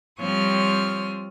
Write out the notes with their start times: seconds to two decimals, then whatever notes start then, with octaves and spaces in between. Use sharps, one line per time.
0.19 F3 G3 C4 C#5 D#6 F6